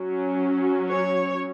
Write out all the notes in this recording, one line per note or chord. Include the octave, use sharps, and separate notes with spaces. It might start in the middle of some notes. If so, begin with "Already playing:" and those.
Already playing: F#3 C#4
C#5